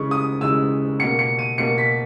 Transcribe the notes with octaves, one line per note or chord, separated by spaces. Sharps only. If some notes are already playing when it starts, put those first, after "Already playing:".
Already playing: C#3 E3 G#3 C#6
D#6
C#3 E3 G#3 E6
B2 A#3 C#7
C#7
D#7
B2 A#3 C#7
B6